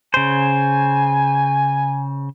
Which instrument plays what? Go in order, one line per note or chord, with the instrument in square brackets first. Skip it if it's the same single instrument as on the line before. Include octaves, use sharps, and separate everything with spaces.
[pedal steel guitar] C#3 C5 [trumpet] G#5